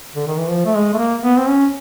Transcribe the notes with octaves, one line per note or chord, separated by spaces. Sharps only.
D3
D#3
E3
F3
A3
G#3
A3
A#3
B3
C4
C#4